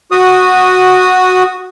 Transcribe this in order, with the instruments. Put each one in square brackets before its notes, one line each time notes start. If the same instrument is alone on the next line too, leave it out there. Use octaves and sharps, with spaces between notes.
[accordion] F#4 D#6